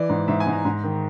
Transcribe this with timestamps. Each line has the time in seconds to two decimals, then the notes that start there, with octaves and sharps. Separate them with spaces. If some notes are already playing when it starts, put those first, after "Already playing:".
Already playing: E3 D5
0.09 G#2
0.28 G#2 E5
0.40 G#5
0.47 G#2
0.53 A#5
0.65 G#2
0.84 D#3